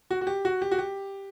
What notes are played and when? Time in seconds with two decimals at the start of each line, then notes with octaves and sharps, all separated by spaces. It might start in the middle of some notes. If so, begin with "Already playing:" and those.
0.11 F#4
0.21 F#4
0.27 G4
0.45 F#4
0.62 G4
0.71 F#4
0.79 G4